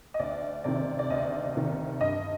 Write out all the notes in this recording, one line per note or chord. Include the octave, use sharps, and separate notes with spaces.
D#5
D2 D5
C3 D#3 D5
D5
D2 D#5
C3 D#3
G2 D#5